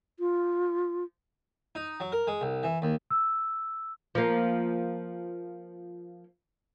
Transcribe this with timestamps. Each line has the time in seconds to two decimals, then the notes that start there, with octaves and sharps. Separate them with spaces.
0.20 F4
1.75 D#4
2.00 F#3
2.12 A#4
2.27 G#3
2.41 C2
2.63 E3
2.82 D#2
3.10 E6
4.15 F3 A#3